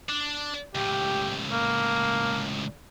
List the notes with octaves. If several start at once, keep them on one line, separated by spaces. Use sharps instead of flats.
D4
C#2 A2 G4
A#3